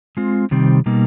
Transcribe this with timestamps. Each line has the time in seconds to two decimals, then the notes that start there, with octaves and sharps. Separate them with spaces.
0.17 G#3 C4 F4
0.51 C3 D#3 G3 C4
0.86 B2 G3 A#3 D#4